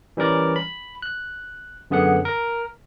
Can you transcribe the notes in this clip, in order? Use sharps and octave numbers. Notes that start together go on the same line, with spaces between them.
E3 G3 C#4 A#4 D5
B5
F#6
F#2 D3 B3 G#4 F#5
A#4